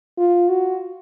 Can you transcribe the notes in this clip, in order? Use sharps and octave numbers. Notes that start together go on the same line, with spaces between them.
F4
F#4